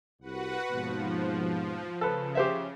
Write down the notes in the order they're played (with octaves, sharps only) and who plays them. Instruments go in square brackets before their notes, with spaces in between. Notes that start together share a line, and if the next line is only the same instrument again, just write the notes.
[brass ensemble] C2 [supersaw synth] F#4 B4 F#5
[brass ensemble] D#2 G#2 B2 [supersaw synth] F3
[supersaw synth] C#3 [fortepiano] A4 B4
[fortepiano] G4 C5 E5